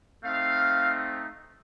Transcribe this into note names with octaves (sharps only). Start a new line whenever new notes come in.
A3 C4 D#4 F5